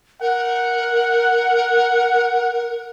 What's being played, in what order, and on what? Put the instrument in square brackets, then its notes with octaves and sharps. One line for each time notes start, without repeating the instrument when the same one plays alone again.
[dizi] A#4 [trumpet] F#5